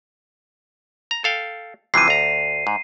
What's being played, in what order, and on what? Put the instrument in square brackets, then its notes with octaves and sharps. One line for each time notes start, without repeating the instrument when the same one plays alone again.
[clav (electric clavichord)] A#5
A4 F5 G5
[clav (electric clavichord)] C3 E3 F3 [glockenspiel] C7 D#7
[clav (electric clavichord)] D2 A#5
G#2